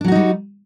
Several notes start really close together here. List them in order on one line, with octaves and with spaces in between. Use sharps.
D4 F#3 F#4 D#4 G3